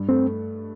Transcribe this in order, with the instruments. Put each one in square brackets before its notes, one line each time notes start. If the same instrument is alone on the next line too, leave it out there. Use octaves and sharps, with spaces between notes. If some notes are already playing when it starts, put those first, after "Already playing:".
Already playing: [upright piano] G2
[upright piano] A3 [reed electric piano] C4